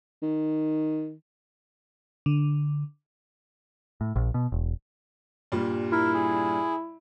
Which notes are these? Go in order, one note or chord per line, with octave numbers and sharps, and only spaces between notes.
D#3
D3
A2
A#1
B2
E1
G2 A#2 G3
E4 A#4
G#4